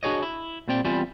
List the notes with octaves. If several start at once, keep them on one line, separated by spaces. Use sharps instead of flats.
D4 F#4 G#4 C#5 D#5
E4
A#2 G3 C4 D5 G5
E2 G3 C4 E4 F4 G#5